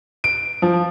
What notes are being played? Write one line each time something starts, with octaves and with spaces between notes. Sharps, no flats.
D7
F3